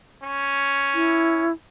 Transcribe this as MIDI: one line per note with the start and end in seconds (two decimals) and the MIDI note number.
0.24 1.46 61
0.95 1.52 64